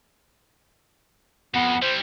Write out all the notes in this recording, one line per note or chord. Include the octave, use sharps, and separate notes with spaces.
F2 B3
G3 E4 C5